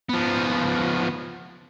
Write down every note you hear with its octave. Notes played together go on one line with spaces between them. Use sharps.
F3 B3